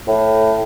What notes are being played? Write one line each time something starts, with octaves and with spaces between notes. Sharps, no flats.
A2